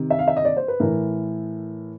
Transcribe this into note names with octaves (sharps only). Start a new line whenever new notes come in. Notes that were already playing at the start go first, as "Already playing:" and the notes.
Already playing: C3 D#3
E5
F5
E5
D#5
D5
C5
B4
A2 E3 A#4